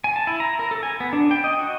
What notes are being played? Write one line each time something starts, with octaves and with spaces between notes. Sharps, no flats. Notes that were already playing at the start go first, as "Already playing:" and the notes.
G#5
A5
E4
A#5
A#4
A4
G#5
B3
D4
G5
D#5
F#4